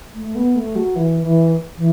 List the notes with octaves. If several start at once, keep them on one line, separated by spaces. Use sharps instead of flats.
A3
B3
A3
F#3
E3
E3
E3